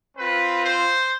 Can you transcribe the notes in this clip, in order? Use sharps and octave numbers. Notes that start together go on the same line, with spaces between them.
C4 F4 B4
C5